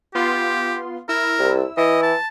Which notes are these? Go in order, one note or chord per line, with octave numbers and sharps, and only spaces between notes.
B3 F4 G4 C6
E4 A#4 E6
C2
E3 D#5
A5